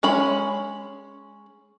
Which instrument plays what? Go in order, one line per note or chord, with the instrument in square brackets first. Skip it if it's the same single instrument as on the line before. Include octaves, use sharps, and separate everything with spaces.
[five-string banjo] G#3 C#4 B5